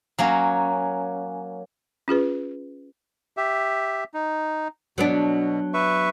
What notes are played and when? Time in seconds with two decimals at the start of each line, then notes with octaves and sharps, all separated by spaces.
0.18 F#3 A#3 C#4
2.08 C#4 F4 G#4 B4
3.37 G4 E5
4.14 D#4
4.98 B2 F#3 B3 D4
5.74 B4 E5 C#6